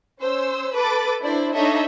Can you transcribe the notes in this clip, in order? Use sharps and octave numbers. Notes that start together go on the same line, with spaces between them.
C#4 C5 E6
A4 B4 D6 A6
D4 E4 C5 D5
D4 D#4 A4 C#5 D#5 E5